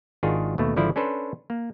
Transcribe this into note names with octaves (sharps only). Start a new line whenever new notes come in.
G#1 D#3 D4 F4 F#4 G#4
D#2 B2 A3
G#1 D3 F3 E4 D5
C#4 D4 A4 B4 C5
A#3